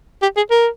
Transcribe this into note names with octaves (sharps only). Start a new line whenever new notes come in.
G4
G#4
A#4